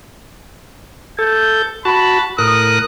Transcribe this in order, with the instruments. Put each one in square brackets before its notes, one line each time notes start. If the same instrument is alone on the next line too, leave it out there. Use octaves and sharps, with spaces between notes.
[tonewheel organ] A4 [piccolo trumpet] G6
[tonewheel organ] F#4 A5 [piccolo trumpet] B5
[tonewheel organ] A2 A#4 F#6 [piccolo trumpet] D#6